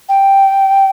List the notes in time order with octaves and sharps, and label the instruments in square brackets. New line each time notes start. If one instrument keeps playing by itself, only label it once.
[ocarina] G5